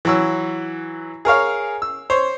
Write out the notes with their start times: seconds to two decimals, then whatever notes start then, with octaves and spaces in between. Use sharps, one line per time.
0.05 E3 F#3 E6
1.25 G#4 A#4 C#5 F5
1.82 E6
2.10 C5 C#5